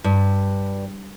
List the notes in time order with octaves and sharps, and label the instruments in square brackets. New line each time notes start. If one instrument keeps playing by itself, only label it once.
[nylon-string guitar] G2